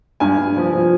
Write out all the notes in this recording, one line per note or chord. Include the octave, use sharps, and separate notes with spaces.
G2 G#5
G2
F3
F3